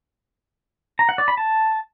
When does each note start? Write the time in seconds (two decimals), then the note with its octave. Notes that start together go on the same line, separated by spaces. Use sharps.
0.99 A#5
1.09 F#5
1.18 D5
1.28 B5
1.37 A5